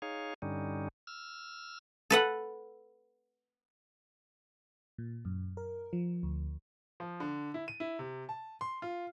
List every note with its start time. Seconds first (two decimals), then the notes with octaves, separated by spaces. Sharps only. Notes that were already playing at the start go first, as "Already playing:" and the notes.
0.02 D#4 G#4 C#5 F5
0.42 G2 D3 G3 C#4 D#4
1.07 E6 F6
2.10 A4 B4 F#5
4.98 A#2
5.25 F#2
5.57 A#4
5.93 F3
6.23 D2
7.00 F3
7.20 D3
7.54 E4
7.68 D#7
7.80 E4
7.99 C3
8.29 A5
8.61 C6
8.82 F4